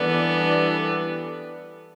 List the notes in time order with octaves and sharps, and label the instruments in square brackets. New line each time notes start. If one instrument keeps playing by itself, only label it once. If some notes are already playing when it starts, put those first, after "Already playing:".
Already playing: [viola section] E3 G3 D4 A4 D5 [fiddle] B3